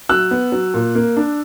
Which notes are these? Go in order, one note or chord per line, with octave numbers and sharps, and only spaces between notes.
F#3 E6 F#6
B3
F#3
A#2
A#3
D4